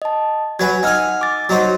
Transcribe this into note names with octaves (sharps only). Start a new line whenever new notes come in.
D#5 A5
F#3 B4 G#5 G#6
D#4 F#5 G#5 E6 F6
D6 A6
F#3 D#4 C5